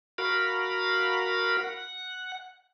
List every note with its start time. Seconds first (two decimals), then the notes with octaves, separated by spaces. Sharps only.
0.18 F#4 A#4 F5 B5
1.64 F#5